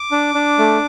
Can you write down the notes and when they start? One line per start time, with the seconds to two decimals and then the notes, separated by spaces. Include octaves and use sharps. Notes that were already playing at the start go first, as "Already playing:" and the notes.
Already playing: D6
0.11 D4
0.34 D4
0.58 A3